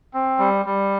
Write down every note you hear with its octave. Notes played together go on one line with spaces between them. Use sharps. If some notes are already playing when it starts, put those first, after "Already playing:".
C4
G3
G3